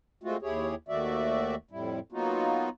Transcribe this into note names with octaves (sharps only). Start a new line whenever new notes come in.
G#3 A3 C4 F4 F#4
D#2 E4 G4 G#4 C#5
D#2 D#3 A3 F#4 D5 E5
F2 A2 G3 E4
F#3 A#3 B3 D#4 F4 F#4